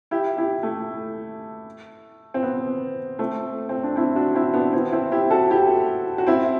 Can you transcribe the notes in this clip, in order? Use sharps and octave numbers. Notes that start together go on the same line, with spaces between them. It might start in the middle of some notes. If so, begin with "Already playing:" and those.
E4 G4
E4 G4
A3
C4
B3
A3 C4
C4
D4
C4 E4
D4 F#4
C4 E4
B3 D4
C4 E4
C4 E4
E4 G4
F#4 A4
E4 G4
F#4
C4 E4